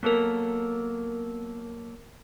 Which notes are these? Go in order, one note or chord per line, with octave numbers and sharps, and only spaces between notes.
F#3 A#3 B3 A4 A#4